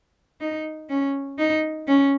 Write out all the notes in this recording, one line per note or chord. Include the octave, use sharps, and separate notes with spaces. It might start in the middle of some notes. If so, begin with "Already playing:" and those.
D#4
C#4
D#4
C#4